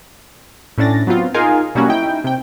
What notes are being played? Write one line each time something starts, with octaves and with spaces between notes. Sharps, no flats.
A2 C#4 D4 A6 A#6
F#3 B3 C4 F4
D#4 F4 G#4 A#4 F5 G#5
B2 F#3 G3 A#3 C#4 F#4
D#4 E4 G5
C3 G5